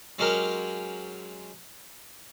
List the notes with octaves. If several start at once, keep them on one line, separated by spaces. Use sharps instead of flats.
F#3 G#3 C#4 G4 A#4